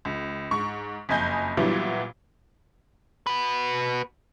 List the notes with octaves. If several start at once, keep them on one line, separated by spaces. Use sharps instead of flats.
C#2
G#2 C#6
F#1 F2 D#5 G#5 G6
A#2 E3 F#3 G3 B3 E4
F#4 B4